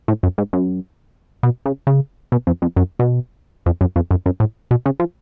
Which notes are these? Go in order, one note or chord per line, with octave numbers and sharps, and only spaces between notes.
A2
F#2
G#2
F#2
B2
C#3
C#3
B2
F2
F2
F#2
B2
F2
F#2
F2
F#2
F#2
A2
B2
C#3
F3